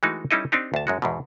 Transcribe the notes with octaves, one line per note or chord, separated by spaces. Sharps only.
E3 G#3 A3 D#4 F#4
G3 C#4 D#4 E4 A4 D#5
C4 D4 D#4 G4
D2 A5
F#2 G#3 F#4
E2 G#2 B2